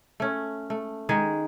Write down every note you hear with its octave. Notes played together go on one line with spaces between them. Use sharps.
A3 C#4
A3
D#3 G#3 G#4